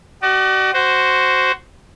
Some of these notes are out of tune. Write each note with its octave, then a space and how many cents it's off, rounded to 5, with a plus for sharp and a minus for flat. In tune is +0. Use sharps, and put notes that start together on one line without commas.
F#4 +40 D5 +40
F#4 +10 C5 +0